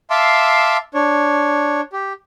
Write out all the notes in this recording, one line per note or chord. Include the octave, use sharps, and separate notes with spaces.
E5 F5 A5 C6 D6 E6
D4 C#5
G4